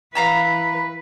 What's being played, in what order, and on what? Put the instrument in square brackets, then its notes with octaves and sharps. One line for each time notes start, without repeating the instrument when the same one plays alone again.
[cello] E3 B4 [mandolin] F5 A#5 E6